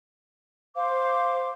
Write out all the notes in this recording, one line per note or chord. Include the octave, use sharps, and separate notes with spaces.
C5 F5 D6